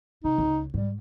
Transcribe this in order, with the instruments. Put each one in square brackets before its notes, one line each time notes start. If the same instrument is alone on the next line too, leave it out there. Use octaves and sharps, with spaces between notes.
[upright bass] C3 [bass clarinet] D#4
[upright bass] C#2
[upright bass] G#2 [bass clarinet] G3